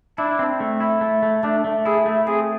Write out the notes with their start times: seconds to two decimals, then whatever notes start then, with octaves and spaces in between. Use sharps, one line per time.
0.18 D4 E4
0.39 C4
0.60 A3
0.80 E4
1.01 A3
1.23 A3
1.43 A3 D4
1.64 A3
1.85 E4 G#4
2.06 A3
2.27 C4 G#4